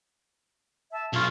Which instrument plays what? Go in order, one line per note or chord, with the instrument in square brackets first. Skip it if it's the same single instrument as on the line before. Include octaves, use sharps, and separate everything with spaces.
[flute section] E5 A5
[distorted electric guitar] B1 [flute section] F4 C#6